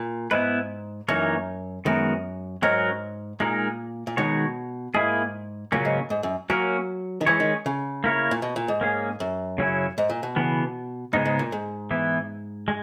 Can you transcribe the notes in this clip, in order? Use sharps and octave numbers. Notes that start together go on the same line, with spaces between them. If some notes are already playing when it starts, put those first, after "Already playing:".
Already playing: A#2
G#2 B3 E4 B4
F#2 E3 A#3 D#4 A#4 C#5
F#2 D#3 G#3 B3 F#4 A#4
G#2 F#3 C#4 F#4 A#4
A#2 G#3 D#4 A#4
A#2
B2 D#3 G#3 D#4 F#4 C#5
G#2 A#3 E4 G#4
A#2 C#3 F#3 A#3 C#4
G#2
G#2
F#2
F#3 A#3 C#4 F#4 A#4
D#3
E3 G#3 C#4 G#4 C#5
D#3
C#3
A#3 E4 A#4 C#5
A#2
B2
A#2
G#2
A#3 C#4 G#4
F#2
C#3 F#3 C#4 E4
G#2
A#2
B2
C#3 E3 B3
G#2 C#3 G#3 B3 D#4
G#2
A#2
G#2
E3 B3 E4
G#3